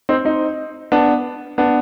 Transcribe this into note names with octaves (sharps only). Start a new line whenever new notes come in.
C4 D#4
C4 D#4
B3 D4
B3 D4